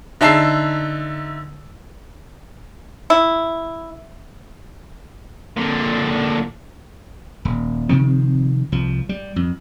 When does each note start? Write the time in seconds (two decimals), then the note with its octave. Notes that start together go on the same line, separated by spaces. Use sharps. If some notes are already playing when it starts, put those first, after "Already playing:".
0.21 D3 D#4 E5 A5 E6 C7
3.10 E4
5.57 A#2 D3
7.45 D#1
7.89 C3 D#3 F3 C4
8.72 C2 F3
9.09 G3
9.36 F2